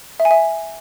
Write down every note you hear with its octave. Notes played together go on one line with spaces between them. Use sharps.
E5
G#5
E5